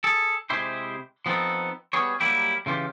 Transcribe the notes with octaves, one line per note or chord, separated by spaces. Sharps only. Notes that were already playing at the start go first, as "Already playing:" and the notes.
G#4 A4
C3 G#3 E4 G4 C5
F3 B3 C4 D#4 A4
G3 B3 G#4 C#5
F#3 G3 A#3 E4 G4
C#3 E3 F4 G4